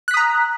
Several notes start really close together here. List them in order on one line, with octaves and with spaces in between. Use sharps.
F#6 B6 D#6 A#5